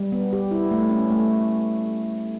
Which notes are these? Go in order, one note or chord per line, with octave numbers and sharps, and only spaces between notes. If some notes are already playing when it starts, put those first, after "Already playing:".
Already playing: G3
B3
G4
E4
A3
C#4
A3